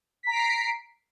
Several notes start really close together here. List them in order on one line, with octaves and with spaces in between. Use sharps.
B6 A#5 D7 C7